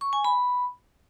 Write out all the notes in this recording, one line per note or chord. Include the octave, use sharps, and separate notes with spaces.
C#6
G#5
B5